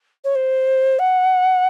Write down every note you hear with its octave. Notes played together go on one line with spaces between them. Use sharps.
C#5
C5
F#5